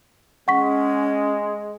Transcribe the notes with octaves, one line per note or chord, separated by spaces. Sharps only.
G#3 C#4 F#5 C#6 B6